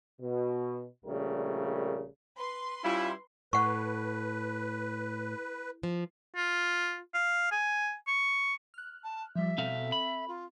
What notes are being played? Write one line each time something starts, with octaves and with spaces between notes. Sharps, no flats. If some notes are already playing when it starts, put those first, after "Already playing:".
B2
A#1 C#3 G3 A3 A#4
B4 C6
G3 C#4 E4 F4
A2 B4 F#5 C#6
F3
F4
F5
G#5
C#6
F6 F#6
A5
F3 G3 E5
B2 C4 A4 F5
B5
F4